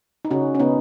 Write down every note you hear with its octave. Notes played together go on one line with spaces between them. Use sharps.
D#4
C#3 C#4 F#4
C#4
C#3 B3 D#4